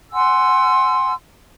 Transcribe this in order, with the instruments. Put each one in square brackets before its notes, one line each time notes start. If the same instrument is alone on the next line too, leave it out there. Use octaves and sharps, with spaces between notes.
[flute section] F#5 G#5 C6 E6